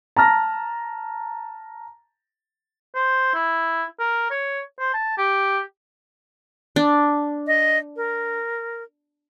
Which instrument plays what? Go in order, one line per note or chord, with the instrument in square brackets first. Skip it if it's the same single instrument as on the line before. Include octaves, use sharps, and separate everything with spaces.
[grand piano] A5 A#5 F6 A#6
[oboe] C5
E4
A#4
C#5
C5
A5
G4
[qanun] D4
[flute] D#5
A#4